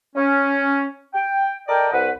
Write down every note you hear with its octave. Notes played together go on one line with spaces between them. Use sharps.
C#4
G5
A4 A#4 D5 D#5 G5
C2 B4 F#5